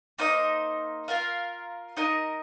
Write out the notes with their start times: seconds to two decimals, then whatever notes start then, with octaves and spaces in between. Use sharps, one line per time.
0.19 A#3 D#4 C5 D#5
1.08 F4 A#4 F5
1.97 D#4 A#4 D#5